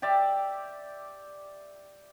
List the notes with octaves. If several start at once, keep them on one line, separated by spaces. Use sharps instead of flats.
G4 D5 E5